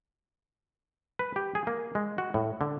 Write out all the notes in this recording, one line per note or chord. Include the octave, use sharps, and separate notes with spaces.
B4
G4
G#4
A#3
G#3
F#4
A2
D3